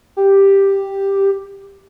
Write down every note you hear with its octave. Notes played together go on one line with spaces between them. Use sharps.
G4